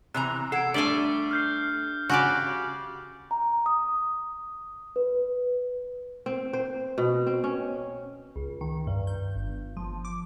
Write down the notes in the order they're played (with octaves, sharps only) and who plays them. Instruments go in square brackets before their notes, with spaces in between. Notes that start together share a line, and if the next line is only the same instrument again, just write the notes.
[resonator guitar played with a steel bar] C3 E3 A#5 [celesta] F#6
[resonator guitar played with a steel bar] A4 [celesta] F#5 G#6 D7 [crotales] C7
[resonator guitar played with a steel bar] G3 A3 A4 [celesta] D4 B6 G7 [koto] D5 G#5
[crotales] F6 G6 C7
[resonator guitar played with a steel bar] C#3 [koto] F#4 G4 D5
[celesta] A#5
D#6
B4
[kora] C4
C5
B2
C4
C#4
[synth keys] C#2
D#3
G2
G6
G1
F3
D6